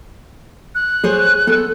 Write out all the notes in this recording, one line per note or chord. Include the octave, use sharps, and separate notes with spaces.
F#6
G#4 C5 C#5
B3 A4